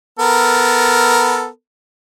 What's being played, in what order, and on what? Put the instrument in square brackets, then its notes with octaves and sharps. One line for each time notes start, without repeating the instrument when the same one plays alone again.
[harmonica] B3 A4 A#4